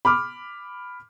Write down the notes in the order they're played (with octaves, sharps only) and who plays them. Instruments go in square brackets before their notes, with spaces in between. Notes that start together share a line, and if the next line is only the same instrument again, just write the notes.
[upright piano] B5 D6 F6